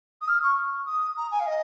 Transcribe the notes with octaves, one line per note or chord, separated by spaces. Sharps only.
D#6
F6
C#6
D#6
A#5
G#5
F5
D#5